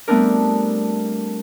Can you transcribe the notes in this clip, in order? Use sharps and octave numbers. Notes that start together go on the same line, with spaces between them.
G3 A3 B3 C4 D4 A#4